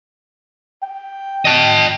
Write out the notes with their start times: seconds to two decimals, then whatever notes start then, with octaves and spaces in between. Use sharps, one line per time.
0.83 G5
1.45 D#5 A5